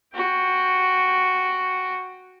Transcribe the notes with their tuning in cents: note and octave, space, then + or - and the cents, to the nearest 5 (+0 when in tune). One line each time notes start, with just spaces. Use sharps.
F#4 +0 G5 +10